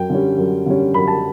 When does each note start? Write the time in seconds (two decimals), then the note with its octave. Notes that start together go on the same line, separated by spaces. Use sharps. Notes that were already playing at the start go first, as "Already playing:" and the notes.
Already playing: F#2 G5
0.10 D3 G3 C#4
0.38 F#2
0.66 D3 G3 C#4
0.94 F#2 B5
1.08 A5